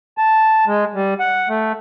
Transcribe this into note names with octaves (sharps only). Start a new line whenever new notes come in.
A5
G#3
G3
F#5
A3